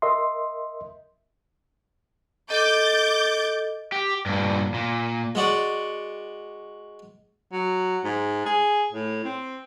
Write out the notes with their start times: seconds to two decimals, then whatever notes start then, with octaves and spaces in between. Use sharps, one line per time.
0.02 A#4 D#5 E5 C6
2.50 A4 D#5 D6 G6 A6
3.92 G4
4.26 G2 A#2
4.74 A#2
5.35 G#3 F#4 D5
7.53 F#3
8.04 G#2
8.46 G#4
8.92 A2
9.24 C4